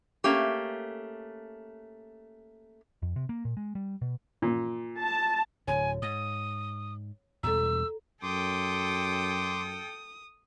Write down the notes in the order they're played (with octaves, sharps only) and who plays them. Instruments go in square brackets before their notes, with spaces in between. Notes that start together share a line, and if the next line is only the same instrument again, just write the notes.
[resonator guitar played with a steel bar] A3 A#3 C#4 G4
[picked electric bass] F2
C3
A#3
A#2
G#3
G3
B2
[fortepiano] A#2
[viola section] A5
[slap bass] D1 D3 [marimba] C#5 [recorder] G#5
[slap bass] G#2 [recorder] D#6
[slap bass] E2 B2 G3 [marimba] A4 A#5 [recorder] E6
[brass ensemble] F#2 [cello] A4 G5 [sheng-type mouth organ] C6 D6 [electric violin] D#6